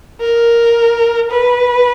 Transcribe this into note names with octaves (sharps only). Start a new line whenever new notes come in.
A#4
B4